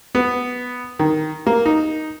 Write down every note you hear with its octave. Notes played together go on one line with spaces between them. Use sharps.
B3
D#3
A#3
D#4